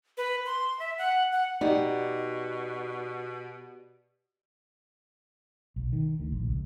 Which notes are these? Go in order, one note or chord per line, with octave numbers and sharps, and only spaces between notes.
B4
C6
E5
F#5
F#5
B2 D#4 G4 D5 F#5
B1
D#3
D2
A#1
C#2